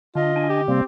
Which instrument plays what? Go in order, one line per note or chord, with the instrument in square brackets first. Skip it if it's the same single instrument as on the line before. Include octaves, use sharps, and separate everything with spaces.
[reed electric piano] D3 [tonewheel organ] D4 [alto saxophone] F4 [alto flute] D#5
[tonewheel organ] D4 G#5
[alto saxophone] G4
[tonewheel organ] C3 G3 A#3 [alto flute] C4